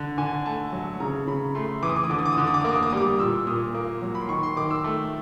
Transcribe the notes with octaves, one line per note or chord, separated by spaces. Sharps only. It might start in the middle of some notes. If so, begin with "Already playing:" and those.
Already playing: D3
D3 G#5
A3 A5
F#3
C#3 A#5
C#3 B5
A3 C6
E3 D6
D#6
D6
D#6
D3 D6
D#6
D6
D#6
D3 D6
D#6
D6
D#6
A#3 D6
D#6
D6
D#6
G3 D6
A#2 E6
A#2 D#6
A#3
F#3
B5
C6
D#3 C#6
C6
D#3 D6
E6
A3